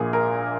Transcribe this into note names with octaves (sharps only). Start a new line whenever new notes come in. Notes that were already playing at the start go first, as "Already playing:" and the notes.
Already playing: A#1 A#2 G#4
A#4